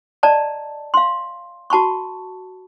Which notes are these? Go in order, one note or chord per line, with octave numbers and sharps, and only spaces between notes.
D5 D#5 A5 A#5
F5 C6
F#4 A5 B5 C#6